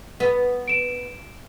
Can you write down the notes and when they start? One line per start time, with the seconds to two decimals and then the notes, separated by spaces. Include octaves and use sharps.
0.20 B3
0.68 D7 E7